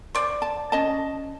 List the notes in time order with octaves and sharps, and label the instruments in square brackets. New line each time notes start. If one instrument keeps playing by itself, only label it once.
[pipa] C5 D5
[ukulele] A5
C#4 D#5 A5